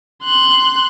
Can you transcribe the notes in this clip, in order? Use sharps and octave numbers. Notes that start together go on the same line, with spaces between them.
C6 F#6